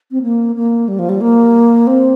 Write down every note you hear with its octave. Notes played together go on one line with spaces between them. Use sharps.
C4
A#3
A#3
G3
F3
G3
A#3
C4